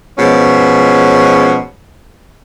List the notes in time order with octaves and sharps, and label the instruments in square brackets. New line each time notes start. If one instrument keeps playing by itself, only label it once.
[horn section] B2 F3 G#3 C#4